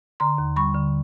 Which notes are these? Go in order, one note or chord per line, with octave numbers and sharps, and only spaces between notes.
D3 A#5 C6
D#2
G3 B5 C#6
D3